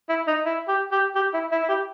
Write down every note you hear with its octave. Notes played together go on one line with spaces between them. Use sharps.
E4
D#4
E4
G4
G4
G4
E4
E4
E4
G4